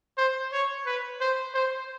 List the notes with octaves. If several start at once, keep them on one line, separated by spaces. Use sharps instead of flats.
C5
C#5
B4
C5
C5